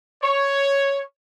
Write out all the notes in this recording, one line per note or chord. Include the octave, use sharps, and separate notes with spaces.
C#5